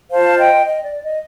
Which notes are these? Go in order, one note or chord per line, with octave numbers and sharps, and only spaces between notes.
F4 C5 F5 A5
D#5 G5
D#5
D5
D#5